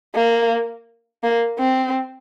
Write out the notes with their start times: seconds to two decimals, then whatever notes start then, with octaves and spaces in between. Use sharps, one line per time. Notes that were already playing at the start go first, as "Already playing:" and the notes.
0.15 A#3
1.23 A#3
1.59 C4